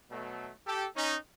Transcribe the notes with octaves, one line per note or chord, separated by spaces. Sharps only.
B2 F#3 A3
G4 A4
C#4 D#4